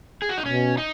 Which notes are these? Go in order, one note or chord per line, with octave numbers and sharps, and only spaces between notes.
G#4
F#4
D#4
B2 C#4
D#4